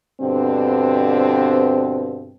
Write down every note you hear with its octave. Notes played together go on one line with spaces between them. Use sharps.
G2 B2 D3 C4